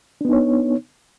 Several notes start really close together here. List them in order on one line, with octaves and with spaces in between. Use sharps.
D4 B3 D#4 C#5